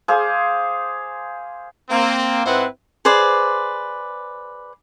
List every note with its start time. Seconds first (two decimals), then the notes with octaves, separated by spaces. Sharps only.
0.08 G#4 C5 F5 D6
1.90 A#3 C4
2.45 G#2 C4 E4 B4 C5 F#5
3.05 G#4 B4 C5 D5